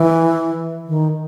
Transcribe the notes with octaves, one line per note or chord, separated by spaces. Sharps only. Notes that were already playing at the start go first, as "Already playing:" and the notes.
Already playing: E3
D#3